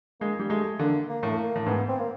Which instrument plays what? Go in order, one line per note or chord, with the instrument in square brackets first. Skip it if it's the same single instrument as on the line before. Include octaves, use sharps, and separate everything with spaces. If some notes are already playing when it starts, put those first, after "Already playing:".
[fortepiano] G#3 [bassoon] A#3
[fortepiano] G3
[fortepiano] G#3 [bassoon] A3
[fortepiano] D3 [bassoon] A#3
[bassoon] A#3
[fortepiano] A2
[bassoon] A3
A#3
[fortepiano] A2
[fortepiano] G#2 [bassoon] B3
[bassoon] C4
A#3